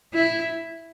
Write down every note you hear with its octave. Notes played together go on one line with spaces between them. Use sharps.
E4